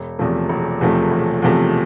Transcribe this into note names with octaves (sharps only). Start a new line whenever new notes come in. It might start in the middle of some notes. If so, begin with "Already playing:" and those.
Already playing: E1
E2 C3 F3 A3
E1
E2 C3 F3 A3
E1
E2 C3 F3 A3